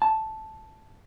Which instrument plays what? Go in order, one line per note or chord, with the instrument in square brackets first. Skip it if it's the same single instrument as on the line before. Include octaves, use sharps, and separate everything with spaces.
[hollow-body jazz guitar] A5